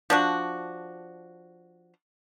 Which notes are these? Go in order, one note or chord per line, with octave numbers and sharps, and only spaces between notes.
F3 D4 F#4